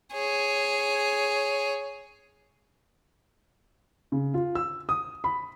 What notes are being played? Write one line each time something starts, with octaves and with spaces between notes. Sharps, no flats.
G#4 C#5
C#3
F4
E6
D#6
B5